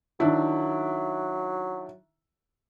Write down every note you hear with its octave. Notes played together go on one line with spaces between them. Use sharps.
D#3 F#3 D4 E4